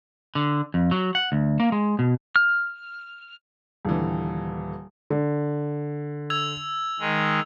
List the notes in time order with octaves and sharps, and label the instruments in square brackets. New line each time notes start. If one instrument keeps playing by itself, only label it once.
[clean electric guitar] D3
F2
F#3
F#5
D2
A#3
G#3
B2
[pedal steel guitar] F6
[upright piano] D#1 D3 E3
[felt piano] D3
[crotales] E6 G#6 F7
[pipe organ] D#3 G#3